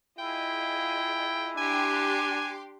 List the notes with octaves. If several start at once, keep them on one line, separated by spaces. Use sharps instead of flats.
E4 F4 G#4 D#5 G5
D4 G4 G#5 C6 D6